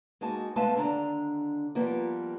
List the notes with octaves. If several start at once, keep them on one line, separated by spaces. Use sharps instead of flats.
G#3 A#3 D#4 F#4 A5
G#3 A3 B3 B4 F5 A5
D#2 D3 D4 A#5
F3 G3 A#3 B3